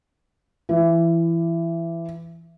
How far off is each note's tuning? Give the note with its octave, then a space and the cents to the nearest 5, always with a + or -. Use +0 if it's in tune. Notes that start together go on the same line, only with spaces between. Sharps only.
E3 +20